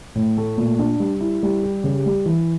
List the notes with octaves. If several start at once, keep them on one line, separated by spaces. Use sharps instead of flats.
A2
A3
A#2
D4
G3
E4
G3
G4
C#3
G3
E3